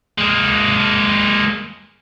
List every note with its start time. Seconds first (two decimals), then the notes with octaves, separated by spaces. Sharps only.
0.19 G#3 A#3